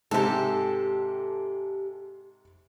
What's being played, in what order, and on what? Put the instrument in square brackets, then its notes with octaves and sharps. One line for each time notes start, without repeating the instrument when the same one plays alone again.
[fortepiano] G#2 C3 G#3 [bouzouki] G4 A4